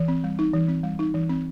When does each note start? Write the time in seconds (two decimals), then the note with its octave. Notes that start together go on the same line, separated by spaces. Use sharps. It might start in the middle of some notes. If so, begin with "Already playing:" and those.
Already playing: E3
0.08 C4
0.24 G3
0.39 D#4
0.54 E3
0.68 C4
0.83 G3
0.99 D#4
1.14 E3
1.29 C4